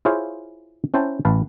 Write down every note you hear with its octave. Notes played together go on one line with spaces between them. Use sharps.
E4 F4 G#4 C5 C#5 F5
C#4 E4 C5 G5 A5
A1 B4 F5 A5